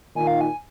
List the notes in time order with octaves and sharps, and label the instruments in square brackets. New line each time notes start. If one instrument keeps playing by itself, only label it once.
[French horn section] A#2 D#3 [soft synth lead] G#5
[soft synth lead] F5
G#5